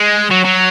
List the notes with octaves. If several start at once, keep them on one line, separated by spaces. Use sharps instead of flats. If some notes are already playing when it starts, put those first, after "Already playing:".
Already playing: G#3
F#3
F#3